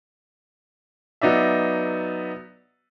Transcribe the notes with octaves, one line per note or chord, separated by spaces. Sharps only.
F#3 B3 D#4 D5 E5